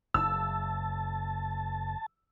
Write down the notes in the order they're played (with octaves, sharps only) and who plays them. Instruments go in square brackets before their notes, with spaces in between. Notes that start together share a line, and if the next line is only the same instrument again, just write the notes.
[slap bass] F#1 [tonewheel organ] A5 [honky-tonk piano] E6